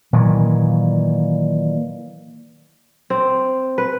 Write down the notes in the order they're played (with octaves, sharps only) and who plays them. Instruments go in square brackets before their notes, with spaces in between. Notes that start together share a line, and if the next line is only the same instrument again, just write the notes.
[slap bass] A#2 D#3 E3 F#3
[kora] C4
B4